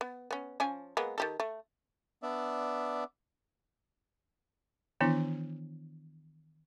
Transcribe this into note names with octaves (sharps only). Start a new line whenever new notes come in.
B3
B3 C#4
F3 C#4 G#5
G#3 A#3 B3
D#3 G4 A4
A3
B3 D4 D5 E5
D#3 E3 B3 D4 E4